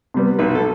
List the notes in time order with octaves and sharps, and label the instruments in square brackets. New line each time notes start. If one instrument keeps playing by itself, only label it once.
[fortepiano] C3 G3 B3
B1 B4
A4